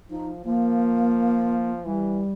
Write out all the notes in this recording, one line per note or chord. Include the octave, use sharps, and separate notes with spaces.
F3 D#4
F3 A#3
E3 G3